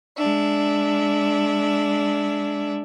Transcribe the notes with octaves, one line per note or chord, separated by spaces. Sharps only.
G#3 D4 E5